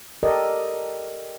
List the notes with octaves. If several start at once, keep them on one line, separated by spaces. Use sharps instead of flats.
G4 A4 A#4 D5 D#5